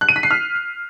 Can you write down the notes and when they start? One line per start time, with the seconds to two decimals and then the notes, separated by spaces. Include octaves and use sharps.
0.01 F#6
0.09 D#7
0.16 B6
0.23 C7
0.31 F6